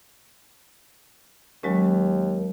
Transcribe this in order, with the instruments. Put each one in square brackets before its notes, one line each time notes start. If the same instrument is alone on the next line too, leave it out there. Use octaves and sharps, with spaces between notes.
[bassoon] D#2 [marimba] F#3 G#3 C#4